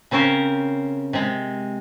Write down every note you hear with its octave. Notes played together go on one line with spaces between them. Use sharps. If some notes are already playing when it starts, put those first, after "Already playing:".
C#3 C4 C#4 A#4 C5
C3 G#3